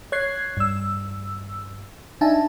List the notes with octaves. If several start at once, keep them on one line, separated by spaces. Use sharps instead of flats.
C#5 F#6 G#6 C7
G2 E6
D4 D#4 E5 G#5 A5